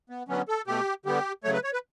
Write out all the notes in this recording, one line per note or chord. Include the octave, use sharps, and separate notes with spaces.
B3
D3 F#3 B3 C#4
A4
B2 A3 G4
D3 G3 B3 G4
C#3 F#3 A3 C#5
B4
C#5
B4